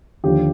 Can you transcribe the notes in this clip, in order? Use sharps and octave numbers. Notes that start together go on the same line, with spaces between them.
D#2 D3 F3 G4